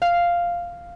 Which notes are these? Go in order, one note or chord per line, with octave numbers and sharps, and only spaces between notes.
F5